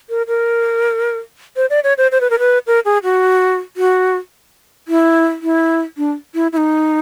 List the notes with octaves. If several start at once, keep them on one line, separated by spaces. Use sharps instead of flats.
A#4
A#4
C5
D5
C#5
C5
C5
B4
A#4
B4
A#4
G#4
F#4
F#4
E4
E4
D4
E4
E4
D#4